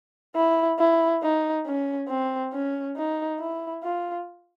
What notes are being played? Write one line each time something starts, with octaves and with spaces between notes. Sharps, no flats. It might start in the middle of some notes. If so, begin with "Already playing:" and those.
E4
E4
D#4
C#4
C4
C#4
D#4
E4
F4